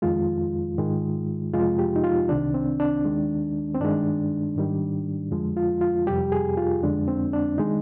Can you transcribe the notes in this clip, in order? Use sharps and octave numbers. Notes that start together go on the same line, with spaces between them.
F2 D#3 G#3 F4
G#2 D#3 G#3
F2 C3 F3 G#3 F4
G4
D#4
F4
C2 C3 D#3 D4
C4
D4
D#2 D#3 G#3
C4
G2 D#3 G#3 D4
G#2 D#3 G3
F2 D3 F3 G#3
F4
F4
F2 C3 G3 G4
G#4
F4
F2 D3 G#3 D4
C4
D4
D#3 G#3 D#4